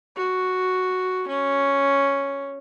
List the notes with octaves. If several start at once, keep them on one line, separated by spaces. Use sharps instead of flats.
F#4
C#4